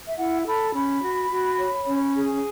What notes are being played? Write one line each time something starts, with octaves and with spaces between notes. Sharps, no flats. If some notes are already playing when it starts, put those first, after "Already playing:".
E5
E4 F#5
A4 B5
C#4 B5
F#4
F#4
C#5
C#4
G#4